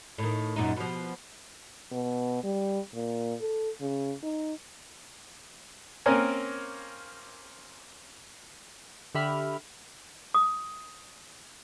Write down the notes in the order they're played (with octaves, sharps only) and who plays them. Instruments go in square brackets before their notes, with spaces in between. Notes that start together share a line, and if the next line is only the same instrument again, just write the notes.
[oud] A2 D#3
F#2 A#2 D#4
B2 F3
[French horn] B2
G3
A#2
A4
C#3
D#4
[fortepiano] A#3 C4 C#4 A#4 G#5
[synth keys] D3 G4 E5 B5 F6
[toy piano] D#6